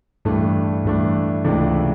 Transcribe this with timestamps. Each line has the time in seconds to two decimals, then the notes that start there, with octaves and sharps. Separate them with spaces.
0.25 G2 E3 A3 D4
0.85 G2 E3 A3 D4
1.44 C#2 C3 E3 A3 D4